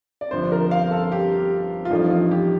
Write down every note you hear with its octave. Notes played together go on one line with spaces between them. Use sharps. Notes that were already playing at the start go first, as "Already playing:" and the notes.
D5
G1 G2 F3 C5
A#4
F5
A4
G4
F4
A1 G2 F3 A3 D4 D#4
F4
G4